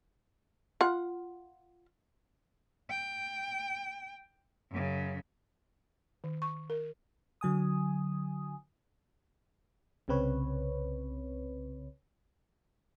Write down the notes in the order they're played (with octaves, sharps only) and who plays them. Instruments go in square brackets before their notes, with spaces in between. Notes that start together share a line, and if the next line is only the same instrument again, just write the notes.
[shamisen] F4 F#5
[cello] G5
F#2 C#3
[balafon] D#3
C#6
A#4
[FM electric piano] D3 F#3 G#5 D#6
C2 C#3 C4 B4 C#5